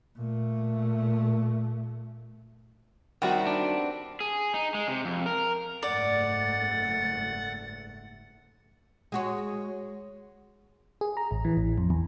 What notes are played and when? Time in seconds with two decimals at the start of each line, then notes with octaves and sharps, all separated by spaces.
0.17 A#2 A3
3.22 D#3 G3 B3 C4 E4 F#4
3.47 D4
4.21 G#4
4.54 D#4
4.75 G#3
4.88 C3
5.05 F2
5.26 A#4
5.83 F#1 G#2 A3 D5 F#5 A6
9.12 G#3 F#4 C#5
11.01 G#4
11.17 A#5
11.31 A1
11.45 E3
11.57 A1
11.78 F2
11.90 E2